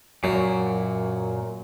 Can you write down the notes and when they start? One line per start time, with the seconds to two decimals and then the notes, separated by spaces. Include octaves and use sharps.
0.24 F#2 A#2 F#3